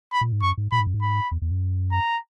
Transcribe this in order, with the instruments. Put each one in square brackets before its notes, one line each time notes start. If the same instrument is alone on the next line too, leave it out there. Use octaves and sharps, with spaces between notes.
[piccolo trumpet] B5
[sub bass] A#2
G#2
[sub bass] F#2 [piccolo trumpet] C#6
[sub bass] G#2
[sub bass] A#2 [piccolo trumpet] B5
[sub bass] G#2
F#2
G#2
[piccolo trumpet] B5
[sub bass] E2
E2
F#2
[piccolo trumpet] A#5